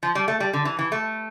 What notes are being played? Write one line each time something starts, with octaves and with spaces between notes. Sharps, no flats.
F3
G3
A3
G3
D3
E3
E3
A3